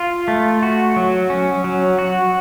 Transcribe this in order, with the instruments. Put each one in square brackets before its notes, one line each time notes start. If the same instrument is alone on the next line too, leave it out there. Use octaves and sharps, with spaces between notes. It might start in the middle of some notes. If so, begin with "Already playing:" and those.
Already playing: [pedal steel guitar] F4
A3
F#4
F#3
C#4
F#3
F#4